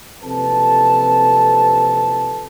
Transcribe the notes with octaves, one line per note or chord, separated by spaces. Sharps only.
F#1 F2 C3 A4 B4 A5